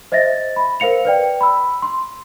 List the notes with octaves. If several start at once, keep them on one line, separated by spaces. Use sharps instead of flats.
C5 D#5 E5 A6 A#6
B5
A#4 C5 F5 C#7 F7
B4 D5 G5
B5 E6
C6